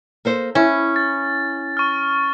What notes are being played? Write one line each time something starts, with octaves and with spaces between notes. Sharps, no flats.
A#3 A4 C5
C#4 E4
A6
C#6 F6